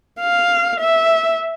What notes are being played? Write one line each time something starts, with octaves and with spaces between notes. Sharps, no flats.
F5
E5